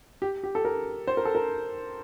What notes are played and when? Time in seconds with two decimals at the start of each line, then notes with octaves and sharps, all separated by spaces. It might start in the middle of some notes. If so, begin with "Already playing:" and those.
0.22 G4
0.44 G4
0.55 A4
0.65 A#4
1.07 C5
1.17 A#4
1.25 A4
1.35 A#4